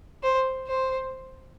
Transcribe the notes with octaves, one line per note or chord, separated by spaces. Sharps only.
C5
C5